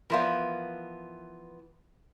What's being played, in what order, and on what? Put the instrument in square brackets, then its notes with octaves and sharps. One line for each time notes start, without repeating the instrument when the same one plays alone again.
[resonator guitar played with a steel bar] E3 F3 B3 [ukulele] A#4 E5 F5